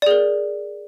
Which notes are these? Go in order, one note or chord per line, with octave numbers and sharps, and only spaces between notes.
G#4 A#4 D5